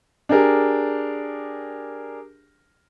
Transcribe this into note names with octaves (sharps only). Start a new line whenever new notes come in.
D4 G4 G#4 A#4